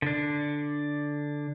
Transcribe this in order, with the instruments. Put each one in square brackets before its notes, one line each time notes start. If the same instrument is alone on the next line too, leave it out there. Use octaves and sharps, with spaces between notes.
[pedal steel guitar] D3 D4